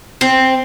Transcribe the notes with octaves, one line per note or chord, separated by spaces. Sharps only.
C4